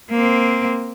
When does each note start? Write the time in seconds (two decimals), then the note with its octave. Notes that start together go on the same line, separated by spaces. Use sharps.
0.11 A#3 C4